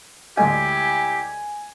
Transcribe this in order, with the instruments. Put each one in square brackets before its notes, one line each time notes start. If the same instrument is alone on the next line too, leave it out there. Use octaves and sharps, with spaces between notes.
[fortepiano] D2 G#3 D#5 [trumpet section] E4 G4 [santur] G#5